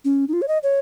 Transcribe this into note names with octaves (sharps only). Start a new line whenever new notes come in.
C#4
D#4
F4
C#5
D#5
C#5